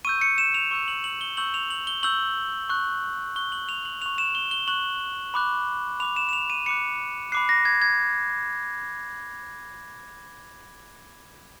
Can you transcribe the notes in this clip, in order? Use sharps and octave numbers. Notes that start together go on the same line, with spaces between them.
C#6 E6 G6 D#7
C#7
E7
F7
C#6 E6 G6
F#7
F#7
G7
C#6 E6 G6 F#7
F7
F#7
G7
C#6 E6 G6 F#7
C#6 F#6
C#6 F#6 G7
F#7
F7
F#7
C#6 F#6 F7
E7
G7
G7
C#6 F#6 F#7
B5 D6 F#6
B5 D6 F#6 F7
E7
E7
F7
D#7
B5 D6 F#6 C#7
B5 D6 F#6 C7
A#6
G#6
G#6